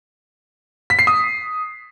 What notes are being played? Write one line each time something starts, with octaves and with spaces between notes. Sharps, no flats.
B6
C7
D#6